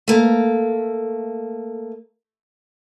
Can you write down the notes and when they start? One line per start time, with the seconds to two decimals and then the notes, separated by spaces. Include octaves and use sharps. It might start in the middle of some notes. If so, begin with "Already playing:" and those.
0.08 A3 A#3